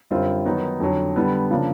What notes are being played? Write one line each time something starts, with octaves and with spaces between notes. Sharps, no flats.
F#2 D3 G3 C4 F4
D#3 F#3 B3 D#4
F2 D3 F#3
D3 G3 B3
C#3 F3 A#3 D4